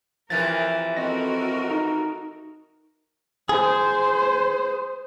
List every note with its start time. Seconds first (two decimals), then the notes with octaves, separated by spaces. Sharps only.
0.30 C3 E3 F3 A#4 A6
0.97 C4 F#4 A4 A#4 D#5 A#6
1.70 D#4
3.49 G#4 C5